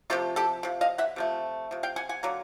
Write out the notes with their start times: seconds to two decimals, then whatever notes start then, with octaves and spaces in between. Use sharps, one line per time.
0.10 C3 F3 A3 F4 G4
0.36 G4 A4
0.63 C3 F3
0.81 D#5 F5
0.98 E5 F#5
1.16 C3 F3 A3
1.71 C3 F3
1.83 F5 G5
1.96 F#5 G#5
2.09 F#5 G#5
2.23 D3 F#3 A#3